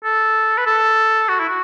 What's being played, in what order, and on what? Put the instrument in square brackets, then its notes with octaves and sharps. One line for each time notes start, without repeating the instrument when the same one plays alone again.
[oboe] A4
B4
A4
F#4
E4
F#4